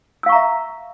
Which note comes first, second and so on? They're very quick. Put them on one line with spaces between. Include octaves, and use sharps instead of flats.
E6 F5 C#6 A#5 E5